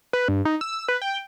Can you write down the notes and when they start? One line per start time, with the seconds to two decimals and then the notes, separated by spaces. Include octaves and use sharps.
0.13 B4
0.28 G2
0.45 D#4
0.61 E6
0.88 B4
1.02 G5